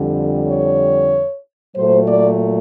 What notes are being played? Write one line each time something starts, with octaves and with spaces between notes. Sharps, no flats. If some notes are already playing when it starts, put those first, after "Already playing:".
Already playing: F2 D3 G3
C#5
A#2 F#3 A3 C5
D5